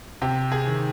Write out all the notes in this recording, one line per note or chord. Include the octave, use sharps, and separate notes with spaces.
C3 G4
G#4
D#3